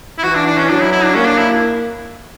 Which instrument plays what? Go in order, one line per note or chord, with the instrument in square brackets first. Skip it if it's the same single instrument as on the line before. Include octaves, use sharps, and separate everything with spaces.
[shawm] E4
[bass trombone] E3 [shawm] F#4
[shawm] D4
D4
C#4
[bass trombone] F#3 [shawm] D4
[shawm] E4
E4
D4
[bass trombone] A#3 [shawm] C#4
[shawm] D4
E4